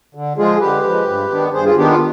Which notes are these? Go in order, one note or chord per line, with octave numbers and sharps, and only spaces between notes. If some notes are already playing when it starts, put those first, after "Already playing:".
D3
F3 G#3 F4 G#4
D3 G4 B4
F3 G#3
G2
D#3 B3 D4
G2 G#4 C5
F4 G#4
D#3 B3 D4 G4
F4